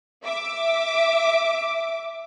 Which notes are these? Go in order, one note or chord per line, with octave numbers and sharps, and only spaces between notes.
E5 D6